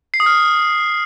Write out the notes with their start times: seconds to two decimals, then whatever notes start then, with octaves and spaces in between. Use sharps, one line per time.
0.14 C7
0.20 D#6
0.26 F6